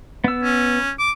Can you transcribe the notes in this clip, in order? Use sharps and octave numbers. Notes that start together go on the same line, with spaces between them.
B3 E6
C#4
D6